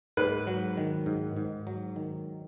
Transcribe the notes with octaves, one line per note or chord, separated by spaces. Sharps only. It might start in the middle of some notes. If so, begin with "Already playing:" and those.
G#2 B4
F#3
D#3
G#2
G#2
F#3
D#3